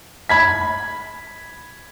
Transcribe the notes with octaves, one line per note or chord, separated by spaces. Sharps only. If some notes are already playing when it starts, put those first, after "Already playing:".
B5 G#6 B6